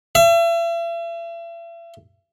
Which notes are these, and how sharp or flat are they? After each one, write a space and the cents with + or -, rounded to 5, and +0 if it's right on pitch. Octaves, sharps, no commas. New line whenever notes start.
E5 +40